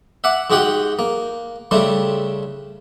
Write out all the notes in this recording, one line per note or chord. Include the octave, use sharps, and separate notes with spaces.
E5 F#5 D6
G#2 G#3 F#4 G4 F#5 G5
A#3
C#3 G3 A3 C4 D4